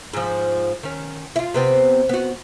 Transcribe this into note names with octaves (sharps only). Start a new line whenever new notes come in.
G#2 F3
D#3 C#4
E4 F4
C3 B3 C4
B3 F#4